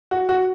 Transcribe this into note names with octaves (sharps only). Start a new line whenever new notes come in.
F#4
F#4